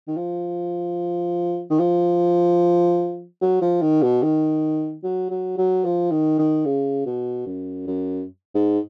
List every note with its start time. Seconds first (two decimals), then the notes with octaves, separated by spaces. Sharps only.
0.08 D#3
0.17 F3
1.70 D#3
1.80 F3
3.41 F#3
3.62 F3
3.82 D#3
4.02 B2
4.23 D#3
5.04 F#3
5.30 F#3
5.58 F#3
5.85 F3
6.11 D#3
6.39 D#3
6.66 C#3
7.06 B2
7.47 F#2
7.87 F#2
8.55 G#2